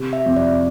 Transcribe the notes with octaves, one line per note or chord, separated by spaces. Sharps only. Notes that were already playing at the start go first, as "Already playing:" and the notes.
Already playing: C3
E5
F2
D5